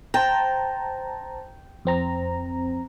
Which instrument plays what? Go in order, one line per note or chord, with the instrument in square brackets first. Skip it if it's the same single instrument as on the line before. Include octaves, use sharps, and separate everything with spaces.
[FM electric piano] C5 A5 A#5 [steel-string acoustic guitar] G5
[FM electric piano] F2 C4 A#5